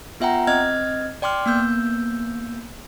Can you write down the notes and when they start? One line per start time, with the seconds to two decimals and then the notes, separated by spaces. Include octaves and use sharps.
0.20 B3 F4 E5 F#5 G5 A#5
0.47 C4 D#5 F6 G#6
1.22 D5 G5 C6 D6 F6
1.46 A#3 B3 E6 G6